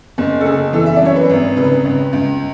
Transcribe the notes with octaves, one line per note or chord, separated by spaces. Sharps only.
F#1
A4
C#3 G#4
E3 A4
E5
D5
F#2 C#5
B4
G#1
C#3 B4
C#2
C#2